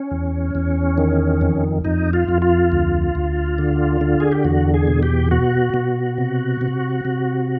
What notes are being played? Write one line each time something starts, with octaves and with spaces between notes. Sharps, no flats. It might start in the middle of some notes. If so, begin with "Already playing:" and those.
Already playing: C#4
E2
E2
D#3
F2
F2 D#4
F4
F2
F4
D2
D2
D3
D3
G#4
G4
E2 F#4
G#4
B2
G4
B2 F#4
B2
C3
C3
C3